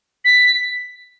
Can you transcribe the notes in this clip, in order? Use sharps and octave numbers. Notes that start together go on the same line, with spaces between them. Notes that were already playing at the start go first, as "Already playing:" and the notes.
B6